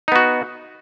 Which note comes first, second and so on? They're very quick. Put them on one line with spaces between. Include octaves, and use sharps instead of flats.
D#4 B3 F#4